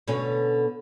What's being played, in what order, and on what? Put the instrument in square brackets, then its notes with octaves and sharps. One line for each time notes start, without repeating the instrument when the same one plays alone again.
[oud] B2 D3 C#4